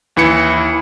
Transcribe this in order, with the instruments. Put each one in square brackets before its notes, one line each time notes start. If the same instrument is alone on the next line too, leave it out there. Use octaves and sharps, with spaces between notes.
[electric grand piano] D#2 E3 E4 C#7